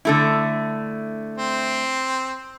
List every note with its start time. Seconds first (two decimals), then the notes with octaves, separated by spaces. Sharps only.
0.05 D3 A3 E4
1.38 C4